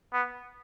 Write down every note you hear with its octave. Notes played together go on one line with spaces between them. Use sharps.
B3